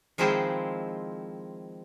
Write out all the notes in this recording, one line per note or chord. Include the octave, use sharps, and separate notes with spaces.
D#3 F3 G#3 C4 E4 F4